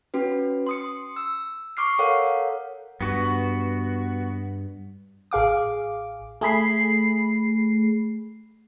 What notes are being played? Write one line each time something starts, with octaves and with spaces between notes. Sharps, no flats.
C#4 F#4 B4
C6 D#6 C#7
E6
C#6 D6 F6 C7
A4 A#4 C#5 F5 F#5
G2 B3 F#4
A1 G#4 F5 D6
A3 G#4 B5 C7